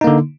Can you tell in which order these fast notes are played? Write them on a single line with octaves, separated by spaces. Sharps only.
D#4 A#3 D3